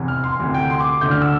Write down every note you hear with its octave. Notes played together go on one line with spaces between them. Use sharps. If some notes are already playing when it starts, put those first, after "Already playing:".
Already playing: F1 E2 C3 E3
F6
C6
D2 C3 E3
G5
C6
D6
D2 D3 G6
F6
E6